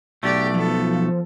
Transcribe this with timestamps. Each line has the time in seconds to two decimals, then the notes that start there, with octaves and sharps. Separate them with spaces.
0.23 B1 A3 G4 D5
0.54 F3 B3 A4